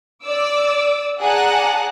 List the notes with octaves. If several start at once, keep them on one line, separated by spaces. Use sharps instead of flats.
D5 D6 E6
G#4 D5 F#5 A5 A#5 F#6